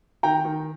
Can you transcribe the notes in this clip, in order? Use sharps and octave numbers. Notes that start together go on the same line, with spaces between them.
D#3 G5 A#5
D#3